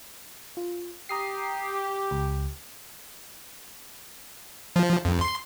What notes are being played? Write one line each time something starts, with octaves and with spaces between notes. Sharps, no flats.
F4
G4 A#5 D#6 C7
C#2
F3
F2
C6